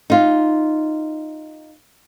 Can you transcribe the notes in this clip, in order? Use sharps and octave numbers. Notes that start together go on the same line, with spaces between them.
D#4 F4